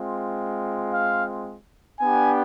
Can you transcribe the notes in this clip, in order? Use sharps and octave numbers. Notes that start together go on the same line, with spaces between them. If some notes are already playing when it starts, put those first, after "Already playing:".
Already playing: G#3 C4 F4
F5
B3 D4 G4 G#5